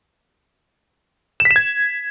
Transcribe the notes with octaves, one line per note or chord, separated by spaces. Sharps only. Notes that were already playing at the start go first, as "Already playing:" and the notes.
E7
B6
E7
G#6